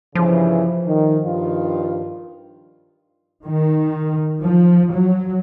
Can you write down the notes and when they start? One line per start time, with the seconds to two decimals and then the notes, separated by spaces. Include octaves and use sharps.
0.15 G2 C#3 E3 F3
0.86 D#3
1.24 G2 D#3 F4
3.45 D#3
4.40 F3
4.91 F#3